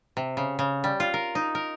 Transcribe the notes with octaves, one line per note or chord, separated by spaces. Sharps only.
C3
C#3
C#3
G3
F4
A#4
D#4
A#4